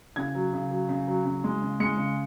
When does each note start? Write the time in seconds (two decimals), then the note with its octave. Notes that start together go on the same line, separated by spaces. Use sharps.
0.16 C#3 G#6
0.35 F#3
0.53 C#3
0.71 F#3
0.89 C#3
1.08 F#3
1.25 C#3
1.44 G#3
1.62 C#3
1.80 G#3 C#7
1.98 C#3